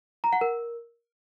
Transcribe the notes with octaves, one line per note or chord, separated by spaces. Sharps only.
A#5
F#5
A#4